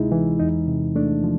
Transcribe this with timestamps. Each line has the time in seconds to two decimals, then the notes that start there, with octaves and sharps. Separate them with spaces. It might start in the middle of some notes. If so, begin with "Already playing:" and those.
Already playing: D2 C3 G#3 D#4 E4 G#4
0.12 E3
0.39 E2 D#4
0.67 C3
0.96 A3 D4
1.24 F3